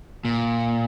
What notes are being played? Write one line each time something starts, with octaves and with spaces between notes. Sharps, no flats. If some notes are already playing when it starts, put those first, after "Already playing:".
A#2